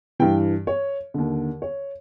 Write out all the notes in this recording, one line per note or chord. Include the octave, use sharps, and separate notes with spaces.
G2 E3 G5
C#5
D#2 D3
C#5